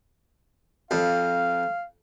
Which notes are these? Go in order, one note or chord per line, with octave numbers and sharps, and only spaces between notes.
F2 F5